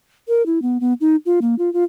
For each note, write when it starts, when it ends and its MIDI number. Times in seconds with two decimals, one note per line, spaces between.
0.28 0.45 70
0.46 0.61 64
0.62 0.78 59
0.81 0.93 59
1.01 1.16 63
1.26 1.39 65
1.42 1.55 58
1.59 1.72 65
1.73 1.84 65